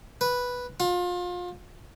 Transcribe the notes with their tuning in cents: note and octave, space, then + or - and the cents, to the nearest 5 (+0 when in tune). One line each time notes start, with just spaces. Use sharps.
B4 -5
F4 +30